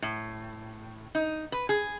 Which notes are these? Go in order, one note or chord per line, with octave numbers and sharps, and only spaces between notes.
A2
D#4
B4
G#4